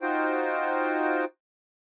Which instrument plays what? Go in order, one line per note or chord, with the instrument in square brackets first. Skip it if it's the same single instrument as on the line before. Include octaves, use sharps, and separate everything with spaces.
[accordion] D#4 F4 F#4 C5 G5